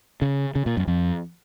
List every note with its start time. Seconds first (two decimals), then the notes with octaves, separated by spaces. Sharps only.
0.22 C#3
0.56 C#3
0.66 A#2
0.77 F#2
0.88 F2